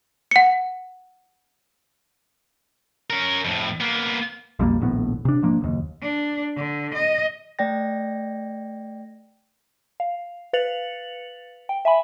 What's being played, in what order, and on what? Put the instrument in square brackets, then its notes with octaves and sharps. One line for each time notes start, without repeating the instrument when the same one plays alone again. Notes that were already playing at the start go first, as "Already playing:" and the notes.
[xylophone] F#5 C#7
[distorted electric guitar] C#4 A#4
F2 A2
A#3 B3
[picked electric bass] B1 F2 G3 A#3
D#1 A#1 A2 B3
C3 D4
G#2 F3 A#3 D4
F#1 D#2
[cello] D4
D3
D#5
[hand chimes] A3 D5 G5 A#6
[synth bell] F5
B4 F5 A6 C#7 F7 F#7
G5
E5 G#5 B5